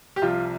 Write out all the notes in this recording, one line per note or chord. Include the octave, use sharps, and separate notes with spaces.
G4
C2 C3 F3 F4